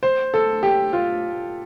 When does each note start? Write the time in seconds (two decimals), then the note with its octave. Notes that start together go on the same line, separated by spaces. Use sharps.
0.03 C5
0.34 A4
0.63 G4
0.93 F4